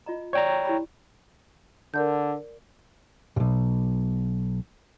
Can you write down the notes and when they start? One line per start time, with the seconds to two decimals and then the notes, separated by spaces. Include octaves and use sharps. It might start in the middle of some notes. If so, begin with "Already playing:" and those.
0.06 F4 D#5 A#5
0.33 C#5 D5 G5 A#5
0.65 E4 G4 B5
1.94 D3 A#4 D5 G6
3.36 B1 G#2